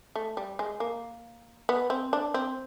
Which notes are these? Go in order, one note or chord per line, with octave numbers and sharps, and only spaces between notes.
A3
G3
G#3
A#3
B3
C4
D4
C4